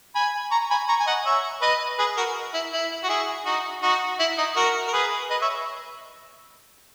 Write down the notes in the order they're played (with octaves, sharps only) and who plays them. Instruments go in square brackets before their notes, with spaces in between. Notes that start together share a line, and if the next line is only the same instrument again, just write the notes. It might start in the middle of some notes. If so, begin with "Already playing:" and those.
[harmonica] G#5 B5
A#5 C#6
G#5 B5
A#5 C#6
G#5
D#5 F#5
C#5 E5
B4 D#5
G#4 B4
F#4 A#4
E4
E4
F#4
E4 G#4
D#4 F#4
D#4 F#4
E4
D#4
F#4 A#4
A#4
G#4 B4
B4 D#5
C#5 E5